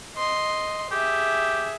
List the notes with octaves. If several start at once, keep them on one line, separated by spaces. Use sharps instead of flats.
D#5 C6
G4 G#4 E5